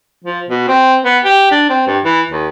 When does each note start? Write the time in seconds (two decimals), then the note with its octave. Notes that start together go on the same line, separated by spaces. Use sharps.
0.25 F3
0.49 B2
0.68 C4
1.05 B3
1.25 G4
1.51 D4
1.70 C4
1.87 G2
2.05 E3
2.30 D#2